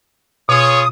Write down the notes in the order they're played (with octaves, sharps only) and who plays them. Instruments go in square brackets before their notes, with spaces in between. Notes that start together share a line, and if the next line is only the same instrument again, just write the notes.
[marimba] B2 [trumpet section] F4 G#4 C#5 [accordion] D#6